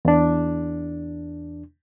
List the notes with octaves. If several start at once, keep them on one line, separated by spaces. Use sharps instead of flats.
E2 D4